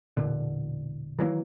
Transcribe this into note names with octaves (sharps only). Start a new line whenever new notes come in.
E1 A#2 D3
D#3 E3 F#3 A#3